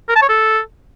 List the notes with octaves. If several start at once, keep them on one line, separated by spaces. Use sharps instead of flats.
A#4
A5
C#5
A4